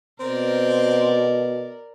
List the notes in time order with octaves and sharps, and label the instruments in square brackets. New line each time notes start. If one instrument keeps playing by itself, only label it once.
[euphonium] B2 [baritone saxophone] C4 [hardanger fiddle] A#4 D5